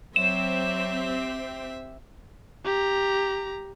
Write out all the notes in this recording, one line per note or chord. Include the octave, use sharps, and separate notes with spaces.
F#3 C4 G4 E5 E7
G4 A#5